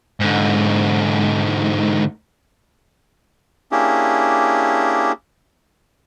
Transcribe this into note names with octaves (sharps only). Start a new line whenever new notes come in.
G#2 D3
A#3 C#4 D4 E4 G4 G#4